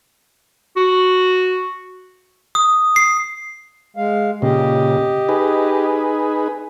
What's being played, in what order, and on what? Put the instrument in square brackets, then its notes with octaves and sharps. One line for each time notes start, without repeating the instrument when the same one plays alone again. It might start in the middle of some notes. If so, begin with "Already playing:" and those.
[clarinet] F#4
[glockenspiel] D#6
C7
[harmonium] G#3 F5
[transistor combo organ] A#2 C#3 [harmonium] G4 D#5
[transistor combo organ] D#4 G#4 B4